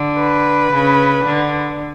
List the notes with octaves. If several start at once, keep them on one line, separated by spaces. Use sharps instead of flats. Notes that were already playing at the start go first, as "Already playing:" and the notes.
Already playing: D3
B4
C#3
D3